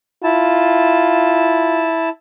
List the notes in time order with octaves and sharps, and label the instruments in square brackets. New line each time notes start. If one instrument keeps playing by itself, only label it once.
[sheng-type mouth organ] E4 A5 [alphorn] F4